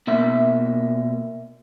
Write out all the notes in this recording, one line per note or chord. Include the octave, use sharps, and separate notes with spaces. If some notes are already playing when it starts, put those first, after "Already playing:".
B2 A#3 E5